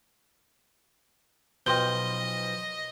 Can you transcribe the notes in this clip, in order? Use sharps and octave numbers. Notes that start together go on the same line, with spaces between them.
B1 F3 D#5 G5 C6 G6 G7